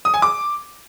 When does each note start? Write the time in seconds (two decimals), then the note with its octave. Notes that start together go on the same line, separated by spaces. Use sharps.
0.05 D#6
0.14 G#5
0.22 D6